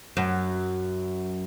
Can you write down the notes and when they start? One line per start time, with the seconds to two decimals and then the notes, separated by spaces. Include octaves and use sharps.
0.17 F#2